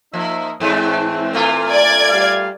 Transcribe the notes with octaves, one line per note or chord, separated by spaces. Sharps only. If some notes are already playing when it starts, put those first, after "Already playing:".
F3 A#3 D#4 E5
G#2 E3 G#3 A3 C4
A#2 A3 F4
D5 G#6
G3 F5